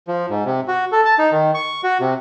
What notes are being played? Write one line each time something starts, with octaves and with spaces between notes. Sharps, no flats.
F3
G#2
C3
F#4
A4
A5
D#4
D#3
C#6
F#4
C3